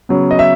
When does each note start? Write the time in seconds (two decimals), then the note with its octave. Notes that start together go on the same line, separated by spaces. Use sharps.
0.09 C#3 F#3 B3
0.31 D#5
0.39 E5